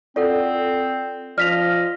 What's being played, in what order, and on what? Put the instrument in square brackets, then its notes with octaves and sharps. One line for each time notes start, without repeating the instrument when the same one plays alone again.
[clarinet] C4 [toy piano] F4 A4 F#5 [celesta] D5
[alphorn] F3 [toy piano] D5 [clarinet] D#5 [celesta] F6 B6 F7